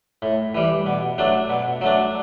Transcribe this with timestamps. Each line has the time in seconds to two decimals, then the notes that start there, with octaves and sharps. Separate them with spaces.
0.22 A2
0.55 E3 G3
0.86 B2
1.18 F#3 A3 D4
1.50 B2
1.81 F#3 A3 D4